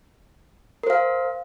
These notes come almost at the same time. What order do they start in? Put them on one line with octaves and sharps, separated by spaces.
A#4 C5 F5